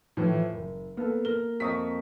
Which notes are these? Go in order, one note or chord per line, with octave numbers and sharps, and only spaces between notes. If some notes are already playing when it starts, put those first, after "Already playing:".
A2 E3 F3
F#1
A#3 B3 A4
A#4 G7
F2 D#5 A#5 C#6 D#6 B6